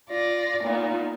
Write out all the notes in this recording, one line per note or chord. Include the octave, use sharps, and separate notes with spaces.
F4 D5 A#6
A#2 B3 D#4 F4